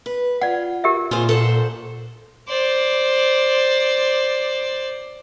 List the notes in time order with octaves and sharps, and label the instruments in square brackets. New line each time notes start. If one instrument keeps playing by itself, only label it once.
[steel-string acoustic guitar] B4
[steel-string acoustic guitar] F4 [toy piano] D5 F#5
[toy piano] G4 A#4 E5
[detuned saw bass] A#2 [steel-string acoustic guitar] F4 G#4 C5
[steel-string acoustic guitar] A4 C5 F#5
[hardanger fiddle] C5 D5